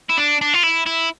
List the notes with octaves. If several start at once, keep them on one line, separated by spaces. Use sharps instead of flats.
E4
D4
D4
F4
E4
E4